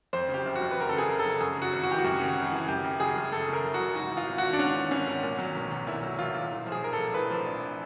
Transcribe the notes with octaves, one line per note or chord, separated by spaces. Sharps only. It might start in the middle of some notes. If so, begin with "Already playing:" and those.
F2 C5
C#3
G4
F#1
F#4
F#1
B4
F2 A#4
A4
C#3
G#4
F#1 A#4
A4
F#1
F#2 G#4
C#3 F#4
G#1
F#4
E3 G4
F#4
F#2
C#3
G#1
E3
F#2 G4
C#3
F#1 G#4
F#1
F#2 A4
C#3
A#4
F#1
F#1 F#4
G#2 F#4
E3
F4
G#1
F#4
G#1
D4
G#2 C#4
E3
G#1 C#4
G#1
A#2
F#3
B1
B1
A#2 E4
F#3
B1 F4
B1
A2
F3
G#4
A#1 A#4
A4
A#1
A2 B4
F3
A#1